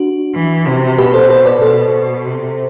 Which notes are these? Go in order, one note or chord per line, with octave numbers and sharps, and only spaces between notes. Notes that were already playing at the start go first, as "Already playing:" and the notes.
Already playing: D4 F#4
E3
C3
B2 G4 B4
A4 C5
A4 C5
B4 D5
B2 A4 C5
C3